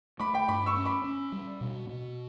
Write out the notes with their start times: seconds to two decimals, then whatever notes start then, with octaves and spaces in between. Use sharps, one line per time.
0.20 A3 B5 D6
0.34 G5 B5
0.48 G2 B5 D6
0.66 C#6 E6
0.77 C#4
0.85 B5 D6
1.04 C#4
1.32 G3
1.61 B2
1.89 B2